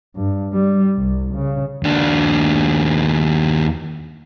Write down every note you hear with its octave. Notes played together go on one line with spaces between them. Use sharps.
G2
G3
C2
C#3
D#2 D4